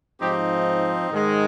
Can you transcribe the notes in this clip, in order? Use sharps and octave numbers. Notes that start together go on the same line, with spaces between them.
G#2 F3 C4 D#4 G4
G#2 D#3 G#3